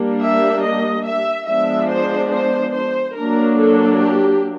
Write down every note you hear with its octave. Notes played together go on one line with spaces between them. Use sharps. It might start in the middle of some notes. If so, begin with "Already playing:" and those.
Already playing: G3 A#3 D4
E5
D#5
E5
F3 G#3 B3 D4 E5
C5
C5
C5
F#3 A#3 D4 A#4
A4
G4